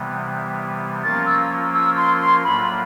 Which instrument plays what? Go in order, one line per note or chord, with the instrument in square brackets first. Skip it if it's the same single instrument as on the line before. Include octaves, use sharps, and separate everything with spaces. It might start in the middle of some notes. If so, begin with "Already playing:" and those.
Already playing: [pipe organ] C3 E3 G3 B3
[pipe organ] F3 A#3 C#4 F4 A#4 [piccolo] A6
[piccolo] E6
E6
C6
C6
[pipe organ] A2 F#3 A#3 D4 F4 [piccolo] B5